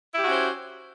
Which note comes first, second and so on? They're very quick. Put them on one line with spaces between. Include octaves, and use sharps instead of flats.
E4 G4 F#4 C#4 C5